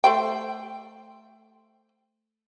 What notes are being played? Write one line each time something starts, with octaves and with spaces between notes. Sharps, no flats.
A3 C5 G5